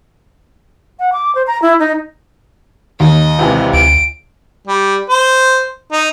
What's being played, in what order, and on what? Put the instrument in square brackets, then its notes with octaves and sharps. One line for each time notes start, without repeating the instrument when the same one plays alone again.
[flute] F#5
D6
C5
A#5
E4
D#4
[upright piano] D#2 [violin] D#5
[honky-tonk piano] C#2 C3 E3
[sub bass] D2 [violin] D7
[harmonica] G3
C5
D#4